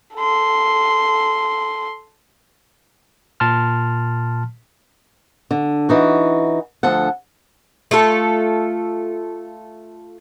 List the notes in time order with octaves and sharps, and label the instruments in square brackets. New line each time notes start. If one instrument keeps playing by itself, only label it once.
[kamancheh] A4 C6
[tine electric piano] A#2 A5 C6 F6
[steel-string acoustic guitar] D3
E3 D#4 F#4
D2 F3 A4 F#5
[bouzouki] A3 F4 A4